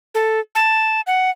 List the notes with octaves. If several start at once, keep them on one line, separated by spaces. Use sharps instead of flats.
A4
A5
F#5